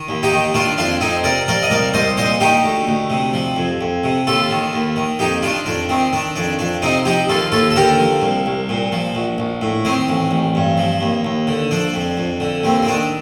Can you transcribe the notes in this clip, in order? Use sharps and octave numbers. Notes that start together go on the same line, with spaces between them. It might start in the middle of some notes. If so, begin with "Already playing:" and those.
Already playing: D#3
D#2
D#4 G4
D#3
D#3 D4 F4
F2 D4 F4
F2 C4 D#4
C3 A#4 D5
F3 A#4 D5
D#5
C2 A#4 D5
C2 C5 D#5
A#2 C5 D#5
D#3 D#4 G4
D2
D2
C3
F3
F2
F2
C3
D#2 F4 A4
D#3
D#2
D#3
F2 D#4 G4
D#3 D4 F4
F2 D4
D#3 C4
D#3 D4
F2 D4
F2 D4
C3 C4 D#4
F3 D#4 G4
D#2 F4 A4
D#2 F4 A4
A4
D3 G4 A#4
F3
C2
C2
A#2
F3
A#1
A#1
A2
D#3 C4
A1
A1
G2
F3
D#2
D#2
D3
F3 D4
F2
F2
D3
D#2 C4
C4
D#3 D4